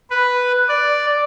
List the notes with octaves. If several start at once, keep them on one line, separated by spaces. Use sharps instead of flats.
B4
D5